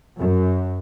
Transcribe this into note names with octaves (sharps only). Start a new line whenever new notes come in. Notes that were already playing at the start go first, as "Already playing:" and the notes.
F#2